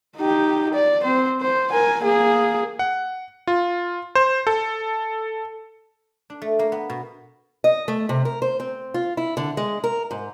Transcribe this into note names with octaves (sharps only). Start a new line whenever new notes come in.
D#4 G4
D5
C4 C5
C5
A#4 G#5
A#3 G#4
F#5
F4
C5
A4
D4
A3
A#3
B3
B2
D#5
A3
C3
A#4
C5
C4
F4
E4
D3
G#3
A#4
G#2